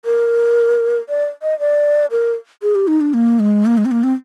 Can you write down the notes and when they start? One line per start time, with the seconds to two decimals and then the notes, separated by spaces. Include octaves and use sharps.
0.05 A#4
1.09 D5
1.42 D#5
1.60 D5
2.11 A#4
2.62 G#4
2.75 G4
2.88 D#4
3.01 D4
3.14 A#3
3.39 G#3
3.66 A#3
3.78 G#3
3.85 C4
3.91 A#3
4.04 C4